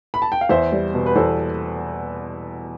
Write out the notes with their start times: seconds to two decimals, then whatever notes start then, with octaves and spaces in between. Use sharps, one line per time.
0.14 B5
0.22 A5
0.32 G5
0.41 F5
0.49 E2 C5 E5
0.72 G3
0.94 B2
1.06 B4
1.15 E2 A4 C5